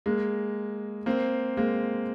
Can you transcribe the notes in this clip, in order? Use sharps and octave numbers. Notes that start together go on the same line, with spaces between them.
G#3 A#3
A#3 C4
G#3 A#3